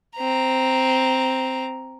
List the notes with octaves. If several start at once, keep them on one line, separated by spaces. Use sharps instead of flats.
C4 A#5